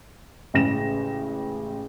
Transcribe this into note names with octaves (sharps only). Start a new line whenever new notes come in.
A1 C#3 G#3 A#6 E7